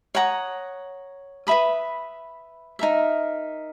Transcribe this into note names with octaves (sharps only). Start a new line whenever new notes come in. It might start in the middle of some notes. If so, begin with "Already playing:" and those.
C#5 F#5 A#5 D#6
B4 E5 B5 D#6
D#4 A#4 E5